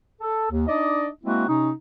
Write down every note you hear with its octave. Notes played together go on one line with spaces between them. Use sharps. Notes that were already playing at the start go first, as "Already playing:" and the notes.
A4
D#2
D4 D#4 D5 D#5
G#3 A#3 C4 E4 F#4
C3 C#4 D#4